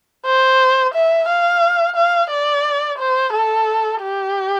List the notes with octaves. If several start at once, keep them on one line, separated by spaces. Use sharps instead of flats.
C5
E5
F5
F5
D5
C5
A4
G4